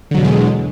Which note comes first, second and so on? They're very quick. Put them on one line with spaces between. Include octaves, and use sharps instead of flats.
D3 F#3 B2 E2 G#3